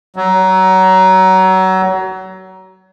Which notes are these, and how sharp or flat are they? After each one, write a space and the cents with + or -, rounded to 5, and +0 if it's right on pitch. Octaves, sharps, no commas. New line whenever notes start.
F#3 +25